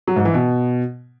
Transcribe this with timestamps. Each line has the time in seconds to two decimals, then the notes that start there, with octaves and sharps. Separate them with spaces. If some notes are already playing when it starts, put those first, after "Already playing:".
0.07 F#3
0.16 G#2
0.25 E3
0.34 B2